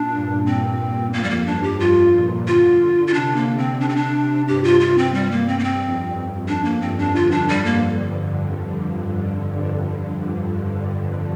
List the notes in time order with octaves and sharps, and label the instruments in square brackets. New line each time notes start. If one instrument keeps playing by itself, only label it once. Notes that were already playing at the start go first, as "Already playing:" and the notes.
Already playing: [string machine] A#2 [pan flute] D4
[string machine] G2
[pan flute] C4
[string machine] F2 [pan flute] A#3
[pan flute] G3
A#3
[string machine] G2 [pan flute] D4
[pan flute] G4
[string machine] G2 [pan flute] F4
[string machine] A#2
[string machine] D3 [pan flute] F4
[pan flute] F4
[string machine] C3 [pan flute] D4
[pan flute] A#3
C4
D4
C4
D4
[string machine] G2 [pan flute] G4
[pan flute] F4
F4
C4
G3
A#3
C4
A#3
C4
[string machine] F2
[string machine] F2 [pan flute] D4
[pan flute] A#3
[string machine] G2 [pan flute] C4
[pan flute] D4
[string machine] D3 [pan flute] F4
[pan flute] D4
G3
A#3